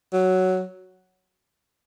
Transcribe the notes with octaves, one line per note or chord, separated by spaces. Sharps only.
F#3